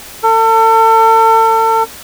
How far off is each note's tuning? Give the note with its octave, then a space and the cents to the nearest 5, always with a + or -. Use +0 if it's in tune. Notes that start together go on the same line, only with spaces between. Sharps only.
A4 +35